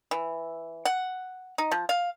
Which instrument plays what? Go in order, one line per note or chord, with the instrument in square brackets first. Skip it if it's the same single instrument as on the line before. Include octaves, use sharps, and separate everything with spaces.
[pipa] E3
F#5
D#4
F3
F5